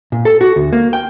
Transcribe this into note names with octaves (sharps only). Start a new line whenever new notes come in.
A#2
A4
F#4
D2
A#3
G5